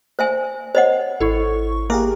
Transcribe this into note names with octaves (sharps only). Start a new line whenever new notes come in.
C5 E5 G#5
C5 C#5 D#5 F#5
G#1 E4 A4 C#6
A#3 G4 G#4 A#4 E5